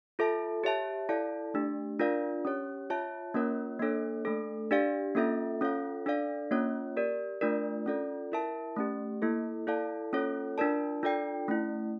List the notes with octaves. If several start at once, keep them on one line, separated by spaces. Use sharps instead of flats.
F4 A4 E5 A5
G4 C#5 E5 A5
E4 A4 D5 F5 A5
A3 D4 G4
D4 F4 A#4 D5 F5
C#4 G4 C#5
F4 C#5 E5 A5
A#3 C#4 F4 A#4 C#5
A#3 D4 A4 C#5
A3 D4 A4
D4 G4 D5 F5
A#3 C#4 F4 A4 E5
C#4 F4 A4 C#5 F5
D4 A4 D5 F5
A#3 C#4 F4 C#5
G4 A#4 D5
A3 D4 F4 A#4 D5
C#4 F4 A4 D5
E4 A#4 E5 A5
A3 C#4 G4
A#3 E4 A4
E4 A4 D5 F5 A5
A#3 C#4 F4 A4 C#5
D4 F4 A#4 D5 A5
D4 F4 A4 D5 G5
A3 C#4 E4